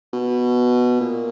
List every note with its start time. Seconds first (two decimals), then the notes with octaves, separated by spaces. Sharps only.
0.13 B2
1.00 A#2